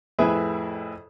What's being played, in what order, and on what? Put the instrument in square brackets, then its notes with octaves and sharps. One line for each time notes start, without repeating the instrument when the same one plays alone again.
[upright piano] F2 A2 E4 G#4 B4 E5